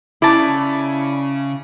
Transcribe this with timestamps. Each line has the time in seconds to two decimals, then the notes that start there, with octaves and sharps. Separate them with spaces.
0.22 C#3 E4 D5 A5